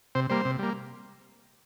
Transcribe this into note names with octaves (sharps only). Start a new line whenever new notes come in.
C3 C5
G3 A#3 C5
C3
G3 A#3